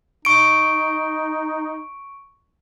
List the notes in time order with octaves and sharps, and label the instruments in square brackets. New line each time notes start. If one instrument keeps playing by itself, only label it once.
[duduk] D#4 [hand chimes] C#6 D7